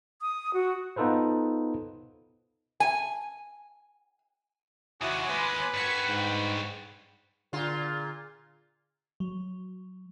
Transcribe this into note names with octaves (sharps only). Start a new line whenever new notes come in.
D#6
F#4
B3 D#4 F4 A4 B4 C5
G#5
D#2 C3 E4 F#4 F#5 G#5 D6 D#6
D#2 G#3 B4 C6
G2 F#4 G#6 B6 C#7
G#2 G5
A#2 D3 F4 G#4
F#3